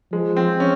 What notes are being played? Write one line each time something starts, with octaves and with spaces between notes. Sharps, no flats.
F3 G#3
C4
C#4